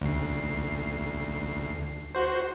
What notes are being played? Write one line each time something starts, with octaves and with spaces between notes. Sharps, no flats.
D2 C7
F#4 C5